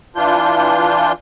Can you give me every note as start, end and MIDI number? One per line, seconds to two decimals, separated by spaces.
0.16 1.12 52
0.16 1.12 62
0.16 1.12 65
0.16 1.12 91